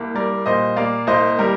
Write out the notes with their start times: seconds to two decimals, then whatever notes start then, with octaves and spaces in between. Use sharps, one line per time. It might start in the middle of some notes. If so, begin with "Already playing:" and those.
Already playing: C2 A#3
0.15 G3 A#4 D5
0.46 A#2 C5 D#5
0.76 A#3 D5 F5
1.07 C2 C5 D#5
1.38 G3 G4 A#4